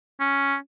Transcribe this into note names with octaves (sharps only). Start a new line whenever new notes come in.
C#4